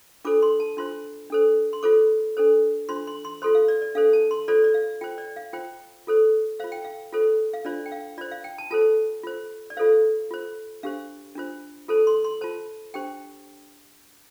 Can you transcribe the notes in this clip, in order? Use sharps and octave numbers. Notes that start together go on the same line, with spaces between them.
D4 F4 A4 C5 D6
C6
A5
D4 F4 C5 C6
D4 A4 C5
C6
F4 A4 C5 D6
D4 A4 C5
D4 F4 C5 C6
C6
C6
F4 A4 C5 C6
F5
D5
D5
D4 A4 C5 F5
A5
C6
F4 A4 C5 D5
D5
F5
F4 C5 G5
D5
F5
F4 C5 G5
F4 A4 C5
F4 C5 F5
G5
F5
F4 A4 C5
F5
D4 F4 C5 D5
G5
F5
F4 C5 D5
F5
G5
A5
F4 A4 C5 A5
F4 C5
D5
F4 A4 C5 F5
F4 C5
D4 G4 C5 F5
D4 F4 C5
F4 A4 C5 A5
C6
C6
F4 C5 A5
D4 G4 C5 G5